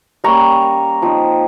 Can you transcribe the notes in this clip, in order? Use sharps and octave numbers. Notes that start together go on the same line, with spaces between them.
G3 A#3 C#4 A#5 C#6
F3 C4 D#4